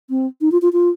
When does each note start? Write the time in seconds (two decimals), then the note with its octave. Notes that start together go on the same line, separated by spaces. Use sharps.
0.10 C4
0.41 D#4
0.52 F4
0.62 F4
0.73 F4